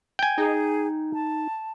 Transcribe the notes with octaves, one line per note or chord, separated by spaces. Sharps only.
G5 G#5
D#4 G#4
A5